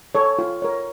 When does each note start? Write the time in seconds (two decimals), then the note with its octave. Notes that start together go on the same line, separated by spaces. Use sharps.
0.15 A4 C#5
0.39 F4
0.62 A#4 C#5